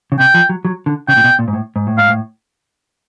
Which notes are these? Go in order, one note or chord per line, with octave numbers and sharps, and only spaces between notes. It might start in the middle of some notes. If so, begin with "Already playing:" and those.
C#3
C3 G5
F3
F#3
F#3
D3
C#3 G5
A#2
B2
A#2
G#2
A2
G#2
A2
G#2 F5
A2